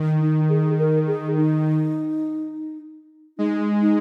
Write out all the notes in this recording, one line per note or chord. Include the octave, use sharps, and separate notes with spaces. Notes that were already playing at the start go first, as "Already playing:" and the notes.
Already playing: D#3
D#4
G#4
A#4
G#4
D#4
G#3 D#4
D#4